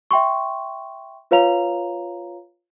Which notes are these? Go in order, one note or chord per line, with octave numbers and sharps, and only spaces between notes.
E5 G5 C6 C#6
F4 B4 C#5 F5 A#5 F7